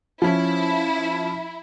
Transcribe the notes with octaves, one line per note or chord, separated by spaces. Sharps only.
F3 C#4 E4